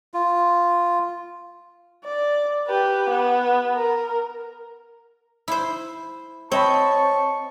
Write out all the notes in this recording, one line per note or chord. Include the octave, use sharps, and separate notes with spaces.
F4
D5
G4 B4
B3
A#4
E4 C5
C4 C#5 D#5 A5 B5 C#6